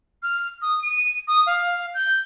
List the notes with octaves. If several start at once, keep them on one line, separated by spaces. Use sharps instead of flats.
F6
D#6
D#7
D#6
F5
G6